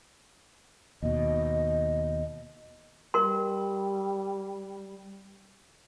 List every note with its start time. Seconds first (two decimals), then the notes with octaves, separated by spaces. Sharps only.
1.02 D#2 B2 D#5
3.14 G3 A#4 C6